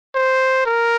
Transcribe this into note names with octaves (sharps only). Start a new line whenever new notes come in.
C5
A#4